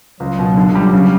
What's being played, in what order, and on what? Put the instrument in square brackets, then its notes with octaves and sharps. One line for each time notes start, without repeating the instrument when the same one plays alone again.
[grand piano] C#2 [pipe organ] F#3
[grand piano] B2
[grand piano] D3 [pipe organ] F#3
[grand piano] G3
C#3